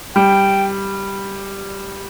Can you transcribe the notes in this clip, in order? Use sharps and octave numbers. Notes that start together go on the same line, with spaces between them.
G3 G5